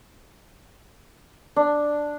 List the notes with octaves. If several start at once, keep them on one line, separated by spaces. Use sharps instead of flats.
D4